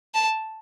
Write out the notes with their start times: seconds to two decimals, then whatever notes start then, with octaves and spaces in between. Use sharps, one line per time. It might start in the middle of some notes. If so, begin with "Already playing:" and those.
0.14 A5